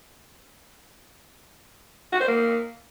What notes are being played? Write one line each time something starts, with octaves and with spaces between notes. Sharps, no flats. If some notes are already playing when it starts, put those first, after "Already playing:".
F#4
C5
A#3